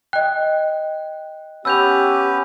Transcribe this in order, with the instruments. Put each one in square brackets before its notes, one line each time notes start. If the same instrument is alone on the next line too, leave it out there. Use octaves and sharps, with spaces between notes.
[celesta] D#5 G5 [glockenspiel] F#6
[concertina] B3 C#4 B4 [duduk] G4 [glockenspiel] E6 G6 F7